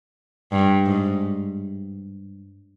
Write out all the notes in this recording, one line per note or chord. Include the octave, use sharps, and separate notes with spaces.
G2
G#2